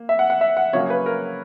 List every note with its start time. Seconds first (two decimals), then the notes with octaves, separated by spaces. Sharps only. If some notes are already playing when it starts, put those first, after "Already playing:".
Already playing: A#3
0.09 E5
0.19 F#5
0.30 F#5
0.41 E5
0.57 F#5
0.73 C#3 F#3 A#3 C#5
0.90 B4
1.06 A#4